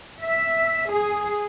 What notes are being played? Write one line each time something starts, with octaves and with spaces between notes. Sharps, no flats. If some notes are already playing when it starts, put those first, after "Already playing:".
E5
G#4